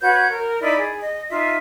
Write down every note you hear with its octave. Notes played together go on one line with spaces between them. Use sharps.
F#4 B4 C#5 G6
A#4
D#4 E4 D5 B5
G#4
D#5
D#4 F4 E5